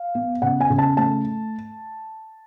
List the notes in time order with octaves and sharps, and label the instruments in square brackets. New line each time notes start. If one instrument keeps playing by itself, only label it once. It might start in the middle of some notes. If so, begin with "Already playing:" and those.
Already playing: [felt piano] F5
B3
C#3 F#5
G#5
C#3
A5
A3 A5